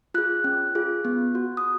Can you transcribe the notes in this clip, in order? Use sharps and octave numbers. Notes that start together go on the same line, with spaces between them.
F4 G#4 F#6
C#4
F4 G#4
B3
F#4
D#6